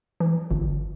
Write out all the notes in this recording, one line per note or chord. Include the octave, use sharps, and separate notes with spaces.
E3
G1